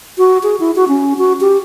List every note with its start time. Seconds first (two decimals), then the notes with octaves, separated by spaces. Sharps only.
0.18 F#4
0.43 G#4
0.60 E4
0.76 F#4
0.88 C#4
1.18 F#4
1.41 G4